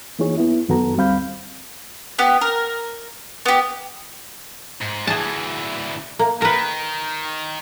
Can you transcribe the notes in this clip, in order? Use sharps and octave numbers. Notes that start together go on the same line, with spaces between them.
E3 A#3 D#4 F4 G#4 C#5
B3 E4
F#2 D#3 B3 F#4 A4 A#5
D2 G3 C4 F5 B5 G6
B3 G4
A#4
B3 G4
G#2
D2 E3 G#4 A5
A#3
D#3 A#4 B4